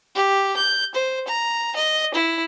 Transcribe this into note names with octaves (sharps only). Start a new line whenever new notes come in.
G4
G6
C5
A#5
D#5
E4